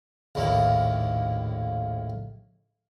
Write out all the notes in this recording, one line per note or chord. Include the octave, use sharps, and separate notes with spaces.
A#1 D#2 A2 A#3